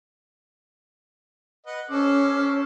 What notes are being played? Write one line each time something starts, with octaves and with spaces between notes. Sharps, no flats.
B4 D#5 F#5
C#4 A4 C5 D6